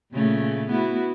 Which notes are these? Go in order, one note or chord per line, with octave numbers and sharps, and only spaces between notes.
A#2 C#3 A3
B3 E4 F#4